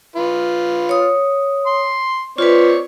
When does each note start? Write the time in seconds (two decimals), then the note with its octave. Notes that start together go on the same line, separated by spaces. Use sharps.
0.16 F4 B4
0.89 C#5 D#6
1.66 C6
2.38 C4 F4 B4 C#5 D5